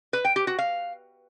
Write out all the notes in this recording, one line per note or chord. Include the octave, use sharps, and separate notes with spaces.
B4
G5
G4
F#4
F5